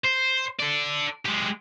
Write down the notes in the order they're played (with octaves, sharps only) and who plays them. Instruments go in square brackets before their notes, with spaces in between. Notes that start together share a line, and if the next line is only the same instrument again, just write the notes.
[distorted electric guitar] C5
A4 D5
G#3 G4